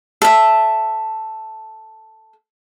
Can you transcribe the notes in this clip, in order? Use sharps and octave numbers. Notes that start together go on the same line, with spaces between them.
A4 E5